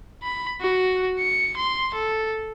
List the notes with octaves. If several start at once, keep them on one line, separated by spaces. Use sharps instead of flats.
B5
F#4
C#7
C6
A4